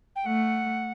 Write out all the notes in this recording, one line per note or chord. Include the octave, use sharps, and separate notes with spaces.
G5
A3 F#5